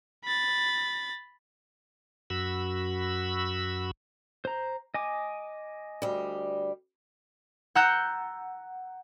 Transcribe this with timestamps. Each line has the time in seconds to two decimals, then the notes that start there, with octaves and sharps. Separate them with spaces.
0.25 B5 A6
2.30 F#2 F#4 B5 E6
4.45 C5 A#5
4.94 D#5 G#5 D6
6.02 D2 G3
7.75 F#5 A#5 E6 F#6 G6 A6